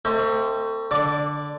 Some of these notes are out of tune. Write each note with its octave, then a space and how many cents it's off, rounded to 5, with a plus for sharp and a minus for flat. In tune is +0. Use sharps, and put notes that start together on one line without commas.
A3 +35 C4 +0 D#5 +45
D3 +0 D5 +0 D6 -20